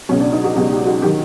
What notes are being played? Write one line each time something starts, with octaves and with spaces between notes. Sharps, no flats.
C#2 B2 F#3 C#4
D4
D#4
F#4
C#2 B2 F#3 G4
G4
F#4
D#3 F#3 G4